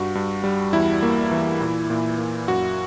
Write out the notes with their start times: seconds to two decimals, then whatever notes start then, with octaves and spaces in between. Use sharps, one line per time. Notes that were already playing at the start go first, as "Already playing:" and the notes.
Already playing: G2 F#4
0.15 G2
0.44 G3
0.73 E2 E4
1.03 A#3
1.31 E3
1.61 A#2
1.90 A#2
2.18 A#3
2.48 F#2 F#4